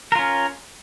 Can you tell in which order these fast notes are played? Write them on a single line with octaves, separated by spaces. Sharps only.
A#4 F4 C#4